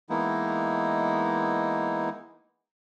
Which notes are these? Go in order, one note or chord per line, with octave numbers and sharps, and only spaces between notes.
E3 G#3 A#3 B3 D#4 E4